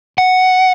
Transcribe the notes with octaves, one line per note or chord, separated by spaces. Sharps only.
F#5